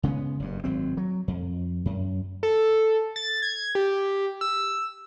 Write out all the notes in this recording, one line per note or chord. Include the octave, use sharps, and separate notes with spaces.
C#3 G#3 A3 B3
F#1 G2
G#1 F#3 C4
F#3
F2
F#2
A4
A6
G#6
G4
E6